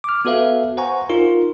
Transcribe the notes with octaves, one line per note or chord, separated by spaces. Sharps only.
D6 F6
B3 F#4 A4 B4 E5 F5
C5 F#5 G#5 A#5 C#6
D#4 F4 A#4